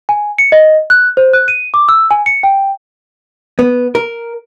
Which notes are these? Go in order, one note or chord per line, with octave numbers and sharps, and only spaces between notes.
G#5
C#7
D#5
F#6
C5
F#6
D#7
D6
E6
G#5
C#7
G5
B3
A#4